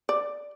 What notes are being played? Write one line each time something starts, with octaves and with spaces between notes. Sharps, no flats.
D5